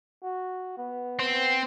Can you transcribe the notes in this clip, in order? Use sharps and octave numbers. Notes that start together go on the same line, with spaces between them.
F#4
B3
C4